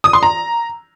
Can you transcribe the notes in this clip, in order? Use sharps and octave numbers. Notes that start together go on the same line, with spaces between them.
D#6
C6
A#5